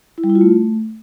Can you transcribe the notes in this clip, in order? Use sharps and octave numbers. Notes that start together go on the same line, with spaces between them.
E4
G3
E4
F4
A3